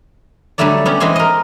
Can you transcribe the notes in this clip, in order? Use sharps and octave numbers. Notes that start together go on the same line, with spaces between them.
D3 F#3 G3 A3 A4 D5
B3 C#4 G4
E3 G#3 C4 D#5 G#5 C6
A#4 D#5